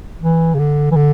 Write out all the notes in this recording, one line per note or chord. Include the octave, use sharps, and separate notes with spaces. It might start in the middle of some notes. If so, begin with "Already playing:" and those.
E3
C#3
D3
E3
D3